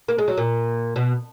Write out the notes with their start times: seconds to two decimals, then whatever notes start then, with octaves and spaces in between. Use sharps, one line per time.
0.08 A#3
0.18 G#3
0.28 F#3
0.37 A#2
0.96 B2